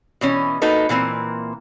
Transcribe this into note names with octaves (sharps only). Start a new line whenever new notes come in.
B2 E3 C#4
A#3 D#4 F#4 A4 B4
A#2 E3 A#3 C4